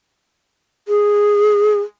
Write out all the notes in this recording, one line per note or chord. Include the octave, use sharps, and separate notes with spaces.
G#4